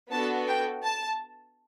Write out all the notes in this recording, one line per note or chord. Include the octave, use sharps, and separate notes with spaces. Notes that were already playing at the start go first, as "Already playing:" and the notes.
B3 D4 F#4 A4 A5
G5
A5